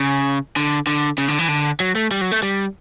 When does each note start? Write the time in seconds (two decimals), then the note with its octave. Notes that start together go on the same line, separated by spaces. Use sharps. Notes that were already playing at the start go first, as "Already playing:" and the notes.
Already playing: C#3
0.56 D3
0.87 D3
1.18 C#3
1.28 D3
1.39 E3
1.48 D3
1.80 F#3
1.95 A3
2.11 G3
2.21 F#3
2.32 A3
2.43 G3